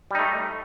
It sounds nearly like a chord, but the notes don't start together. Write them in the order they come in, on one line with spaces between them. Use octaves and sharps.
G3 D#4 A3